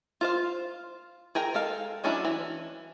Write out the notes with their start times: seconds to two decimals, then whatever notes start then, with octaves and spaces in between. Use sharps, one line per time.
0.21 F4 C5 F5
1.35 G#4 A#4 G5 A#5
1.54 G#3 A4 F5
2.04 D#3 F#3 C#4 D4 E4
2.25 E3